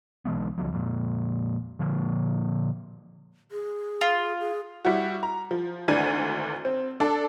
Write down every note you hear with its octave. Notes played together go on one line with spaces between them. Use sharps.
B1 E3 G#3 B3
C#2 F3 F#3
F2 A#2
A#2 D3 F3 A#3
G#4
F4
G#4
G3 E4 F#4
A#5
F3
G#1 D2 E3 D4 G#6 D#7
C4
D4 A4 D5